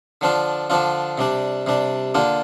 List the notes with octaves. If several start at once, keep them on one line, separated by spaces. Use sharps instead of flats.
D3 F3 D4 F4
D3 F3 D4 F4
C3 G3 D4
C3 G3 D4
D3 A#3 D4 F4